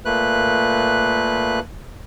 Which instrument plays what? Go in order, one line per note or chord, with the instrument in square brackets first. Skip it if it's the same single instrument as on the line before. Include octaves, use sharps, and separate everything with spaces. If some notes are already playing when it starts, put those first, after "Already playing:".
[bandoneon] A#2 A3 A#3 B4 F#6